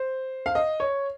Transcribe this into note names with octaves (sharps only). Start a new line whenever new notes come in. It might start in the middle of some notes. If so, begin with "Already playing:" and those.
Already playing: C5
F5
D#5
C#5